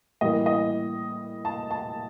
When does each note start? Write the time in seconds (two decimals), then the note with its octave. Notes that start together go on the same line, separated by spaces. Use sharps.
0.21 A2 E3 G3 A#3 D#5
0.46 D#5
1.45 A5
1.71 A5